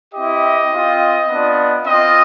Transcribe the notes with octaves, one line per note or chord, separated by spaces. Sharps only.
C4 E4 G4 D#5
C4 F4
B3 D4 F4
C4 F4 D#5